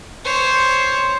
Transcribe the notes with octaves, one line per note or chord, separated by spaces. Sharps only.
C5 C#5